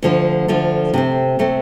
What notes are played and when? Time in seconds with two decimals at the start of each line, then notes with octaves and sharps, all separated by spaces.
0.02 D2 D3 F3 A3
0.48 D2 D3 F3 A3
0.94 C3 A3 C4
1.39 C3 A3 C4